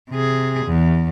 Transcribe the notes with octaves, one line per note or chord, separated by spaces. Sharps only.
C3 G#4
E2